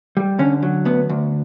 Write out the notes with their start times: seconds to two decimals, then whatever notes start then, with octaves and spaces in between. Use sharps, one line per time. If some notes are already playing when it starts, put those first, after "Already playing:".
0.17 G3
0.39 D3 C#4
0.63 F#3
0.85 D2 B3
1.09 D2